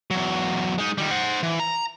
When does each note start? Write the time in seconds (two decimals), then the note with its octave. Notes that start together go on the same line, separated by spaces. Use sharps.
0.11 E2 F#3
0.78 G#3 D#4
0.98 D#3 G3
1.11 C5 F#5
1.43 E3
1.60 A#5